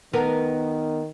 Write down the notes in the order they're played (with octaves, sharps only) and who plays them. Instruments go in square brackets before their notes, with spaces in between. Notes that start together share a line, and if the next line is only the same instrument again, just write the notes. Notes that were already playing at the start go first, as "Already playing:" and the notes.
[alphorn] D#3 [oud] B3 A#4 B4